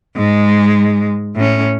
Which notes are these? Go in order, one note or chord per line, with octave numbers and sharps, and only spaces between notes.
G#2 G#3
A2 C#4